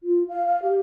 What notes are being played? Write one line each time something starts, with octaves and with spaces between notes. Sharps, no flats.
F4
F5
F5
G4